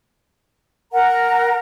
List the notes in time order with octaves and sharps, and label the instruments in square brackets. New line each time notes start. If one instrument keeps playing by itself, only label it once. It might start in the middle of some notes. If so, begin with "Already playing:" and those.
[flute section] A#4 F#5 A#5